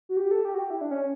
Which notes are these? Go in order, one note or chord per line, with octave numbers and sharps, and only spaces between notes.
F#4
G4
A4
G4
F#4
G4
E4
D4
C#4